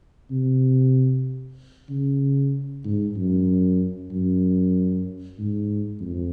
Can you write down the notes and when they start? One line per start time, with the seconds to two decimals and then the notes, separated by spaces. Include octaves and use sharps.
0.31 C3
1.89 C#3
2.84 G#2
3.16 F#2
4.11 F#2
5.38 G#2
6.01 F2